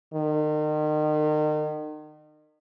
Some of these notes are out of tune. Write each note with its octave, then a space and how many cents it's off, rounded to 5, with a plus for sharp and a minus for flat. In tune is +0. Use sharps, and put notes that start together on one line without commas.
D#3 -35